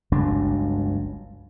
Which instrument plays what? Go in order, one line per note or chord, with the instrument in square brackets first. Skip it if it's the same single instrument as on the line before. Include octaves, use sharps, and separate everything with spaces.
[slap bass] G1 C#2 F#3 D4